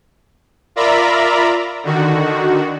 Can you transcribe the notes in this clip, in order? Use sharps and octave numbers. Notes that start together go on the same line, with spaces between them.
F4 A#4 D5 E5 A#5 B5
D3 D#3 F#4